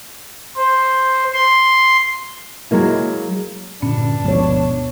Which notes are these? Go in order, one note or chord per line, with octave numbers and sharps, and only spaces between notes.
C5
C6
F#3 G#3 A#3 E4
G2 A#2 D3 C#4 D4
D1 B2 F3 G#3 C#5